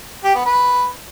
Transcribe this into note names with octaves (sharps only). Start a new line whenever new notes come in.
G4
B3
B4